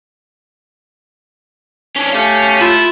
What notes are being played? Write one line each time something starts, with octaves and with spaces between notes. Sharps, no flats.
C#4 D4
A3 C#4 G4 F5
E4 F4